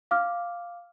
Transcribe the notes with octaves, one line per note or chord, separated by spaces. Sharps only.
F5 D6 F6